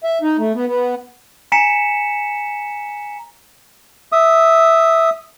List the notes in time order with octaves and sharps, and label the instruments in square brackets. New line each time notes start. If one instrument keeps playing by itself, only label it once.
[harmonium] E5
D#4
A3
B3
B3
[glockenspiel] G#5 A#5 B6 C#7 E7
[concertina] E5 D#6